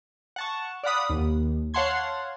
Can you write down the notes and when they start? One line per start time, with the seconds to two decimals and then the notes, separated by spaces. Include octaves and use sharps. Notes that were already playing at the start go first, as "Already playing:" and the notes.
0.36 F#5 A5 C#6
0.83 D5 F5 F#5 B5 D#6
1.10 D#2
1.74 C#5 F5 F#5 A5 C6 G#6